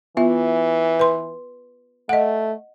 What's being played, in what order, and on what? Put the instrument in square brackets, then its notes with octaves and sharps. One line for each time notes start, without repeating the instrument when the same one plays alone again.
[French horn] E3 [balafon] B3 F4 E5
[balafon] B4 C6
[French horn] A3 [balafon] D#5 F#5